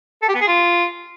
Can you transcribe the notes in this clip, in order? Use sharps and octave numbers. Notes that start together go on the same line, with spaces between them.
A4
G4
B3
G#4
F4